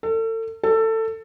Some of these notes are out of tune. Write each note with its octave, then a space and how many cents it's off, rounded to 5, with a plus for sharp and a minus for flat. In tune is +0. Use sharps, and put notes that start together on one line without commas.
A4 +35
A4 +20